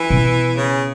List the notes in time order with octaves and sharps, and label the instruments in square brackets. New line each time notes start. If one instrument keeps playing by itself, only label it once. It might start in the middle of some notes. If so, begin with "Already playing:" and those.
Already playing: [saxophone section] E3
[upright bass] B2
[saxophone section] C#3